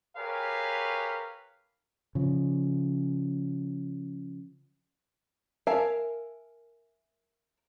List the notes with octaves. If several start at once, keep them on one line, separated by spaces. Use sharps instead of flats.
G4 G#4 A#4 B4 C#5 F5
C#3 F3
A#4 E5 F5 G#5 A5